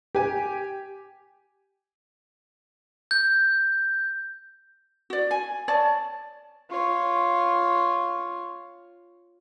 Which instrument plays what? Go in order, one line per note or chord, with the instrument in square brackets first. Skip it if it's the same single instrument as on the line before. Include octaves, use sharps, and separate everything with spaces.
[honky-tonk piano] G4 G#5
[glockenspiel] G6
[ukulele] F#4 D5
G#5
C#5 D5 A5
[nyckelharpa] F4 C#5